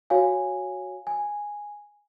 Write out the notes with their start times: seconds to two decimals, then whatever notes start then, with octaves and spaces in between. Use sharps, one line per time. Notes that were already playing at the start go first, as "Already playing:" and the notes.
0.10 F#4 C#5 F5 G#5
1.07 G#5